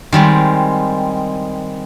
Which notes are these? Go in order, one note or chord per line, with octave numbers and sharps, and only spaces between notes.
D#3 G3 G#3 C4